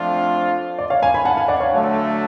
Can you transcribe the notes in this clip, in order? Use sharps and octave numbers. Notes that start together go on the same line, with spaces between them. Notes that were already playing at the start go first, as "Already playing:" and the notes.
Already playing: F2 F3 A3 D4 F4
D5
C#5 F5
F5 G#5
G#5 B5
F#5 A5
F5 G#5
D5 F#5
C#5 F5
D3 F#3 A3